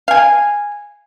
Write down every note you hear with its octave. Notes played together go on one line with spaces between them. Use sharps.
F5 G#5